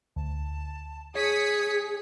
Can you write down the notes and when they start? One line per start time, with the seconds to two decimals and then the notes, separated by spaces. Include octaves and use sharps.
0.16 D2 A5
1.15 G#4 C#5 D#6 G#6 B6 C#7